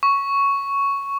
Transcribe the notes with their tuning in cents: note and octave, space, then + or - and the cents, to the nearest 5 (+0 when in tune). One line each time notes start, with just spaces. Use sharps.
C#6 +5